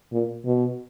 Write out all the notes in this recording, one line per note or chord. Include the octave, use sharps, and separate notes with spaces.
A#2
B2